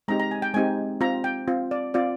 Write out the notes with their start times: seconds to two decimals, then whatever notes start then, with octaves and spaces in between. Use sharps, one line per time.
0.08 G#3 C4 D#4 G4 A#5
0.20 A#5
0.31 G#5
0.42 G5
0.54 G#3 C4 D#4 G4 G#5
1.01 C4 F4 A#5
1.24 G5
1.48 C4 F4
1.71 D5
1.94 C4 F4 D5